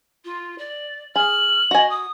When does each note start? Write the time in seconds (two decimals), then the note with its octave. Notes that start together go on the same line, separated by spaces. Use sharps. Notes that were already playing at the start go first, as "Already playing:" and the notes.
0.25 F4
0.59 D5
1.16 G#4 F6 F#7
1.71 F#4 D#5 G#5
1.90 D#6